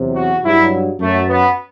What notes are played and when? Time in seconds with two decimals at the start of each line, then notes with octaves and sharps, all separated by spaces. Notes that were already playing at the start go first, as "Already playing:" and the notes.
Already playing: E2 C3 F#3
0.16 F#4
0.44 G2 F#3 E4
1.00 F#2 F#3 A3
1.28 B3